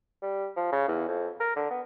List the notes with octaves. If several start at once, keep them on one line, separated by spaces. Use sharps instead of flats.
G3
F3
C#3
E2
F2
A#4
D3
B3